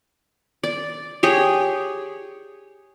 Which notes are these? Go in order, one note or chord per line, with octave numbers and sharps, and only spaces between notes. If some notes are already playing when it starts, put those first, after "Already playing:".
D5
G4 G#4 C#5